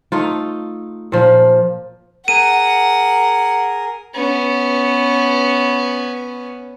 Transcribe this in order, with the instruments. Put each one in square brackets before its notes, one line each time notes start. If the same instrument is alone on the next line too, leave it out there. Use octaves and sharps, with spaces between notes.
[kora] A3 D#4 F4
A#2 F3
[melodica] G#4 A#4 [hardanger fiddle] F#5 [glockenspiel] D#7
[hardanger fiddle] B3 C#4